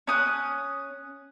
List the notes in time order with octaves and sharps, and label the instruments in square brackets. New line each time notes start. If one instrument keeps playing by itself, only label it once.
[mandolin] C#4 D#6 F#6